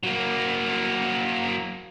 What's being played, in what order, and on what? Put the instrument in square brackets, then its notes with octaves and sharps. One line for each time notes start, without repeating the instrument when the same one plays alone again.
[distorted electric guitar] F#3 A#3